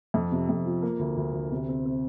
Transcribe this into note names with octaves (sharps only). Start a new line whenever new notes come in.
F2
C3
F2
F3
A#3
D2
D2
D2
C3
C4
C4